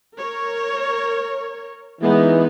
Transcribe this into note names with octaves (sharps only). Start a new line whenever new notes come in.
A#4 C#5
E3 G#3 B3 D#4